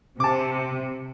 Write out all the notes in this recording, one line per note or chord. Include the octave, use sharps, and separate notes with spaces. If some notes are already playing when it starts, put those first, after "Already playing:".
C3 A5 D6